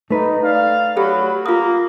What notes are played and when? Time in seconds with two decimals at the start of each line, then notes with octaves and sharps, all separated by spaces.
0.10 A3 D#4 B4
0.44 D5 F5
0.97 F#3 G4 A4 B5
1.46 A#3 F4 A#5 D#6